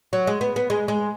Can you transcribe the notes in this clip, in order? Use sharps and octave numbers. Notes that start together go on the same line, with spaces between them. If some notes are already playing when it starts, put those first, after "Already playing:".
F#3
G#3
B3
B3
G#3
G#3